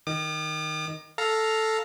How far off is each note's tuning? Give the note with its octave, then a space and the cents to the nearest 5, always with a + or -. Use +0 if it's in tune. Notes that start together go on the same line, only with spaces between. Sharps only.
D#3 +0 D6 +45
A4 +0 F5 +0 A#5 +0